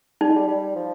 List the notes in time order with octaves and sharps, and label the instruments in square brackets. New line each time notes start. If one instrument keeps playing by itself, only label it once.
[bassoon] G3 [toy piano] D#4
[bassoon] G#3
G3
G3
F3